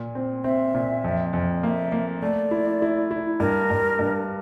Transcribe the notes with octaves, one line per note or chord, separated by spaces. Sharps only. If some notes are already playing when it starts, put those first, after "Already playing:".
Already playing: A#2
C4
C4 E5
A#2
F2
F2
A#3 E5 F5
A#3
A3 D5
E4
E4
E4
G2 A#4
G2
G2